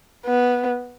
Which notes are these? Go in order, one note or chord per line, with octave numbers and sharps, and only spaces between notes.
B3